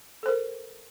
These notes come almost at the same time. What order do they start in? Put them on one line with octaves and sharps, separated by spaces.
A4 C5 A#4